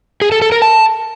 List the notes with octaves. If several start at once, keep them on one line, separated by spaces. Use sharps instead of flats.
G#4
A4
A4
A#4
A5